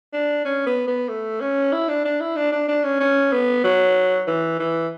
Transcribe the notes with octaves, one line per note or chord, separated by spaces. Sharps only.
D4
C#4
B3
B3
A3
C#4
E4
D4
D4
E4
D4
D4
D4
C#4
C#4
B3
F#3
E3
E3